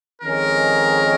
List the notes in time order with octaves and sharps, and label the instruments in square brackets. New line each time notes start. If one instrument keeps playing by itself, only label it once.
[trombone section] F2 D#3 G#3 C#4 G#4 [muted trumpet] A#4